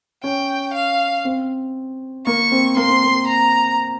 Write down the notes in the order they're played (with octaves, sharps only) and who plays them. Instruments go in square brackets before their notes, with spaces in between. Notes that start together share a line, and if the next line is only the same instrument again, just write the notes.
[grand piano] C#4 [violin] G5
[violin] F5
[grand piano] C4
[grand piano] A#3 [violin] C#6
[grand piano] C4
[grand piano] A#3 [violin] C6
[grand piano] C4
A#3
[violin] A#5